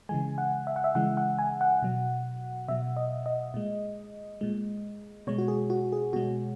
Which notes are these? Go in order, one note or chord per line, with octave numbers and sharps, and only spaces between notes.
C#3 E3 G#3 G#5
F#5
E5
F#5
E5
C#3 E3 G#3 F#5
F#5
G#5
F#5
B2 F#3
B2 F#3 E5
D#5
D#5
A#2 G#3
A#2 G#3
B2 G#3 C#5
F#4
G#4
F#4
G#4
B2 G#3 F#4